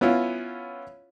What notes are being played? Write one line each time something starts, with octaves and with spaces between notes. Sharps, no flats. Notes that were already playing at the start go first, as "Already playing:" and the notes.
B3 C#4 E4 F4